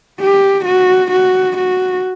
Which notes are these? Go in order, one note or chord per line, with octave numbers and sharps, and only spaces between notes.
G4
F#4
F#4
F#4